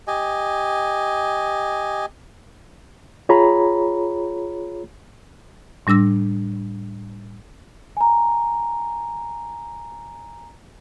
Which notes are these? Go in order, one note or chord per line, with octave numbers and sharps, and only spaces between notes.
G4 D#5 G#5
F4 G#4 C#5 A#5 B5
A2 G3 D4 E6 A#6
G#5 A#5